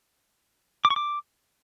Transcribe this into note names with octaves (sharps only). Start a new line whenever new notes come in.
D6
C#6
D6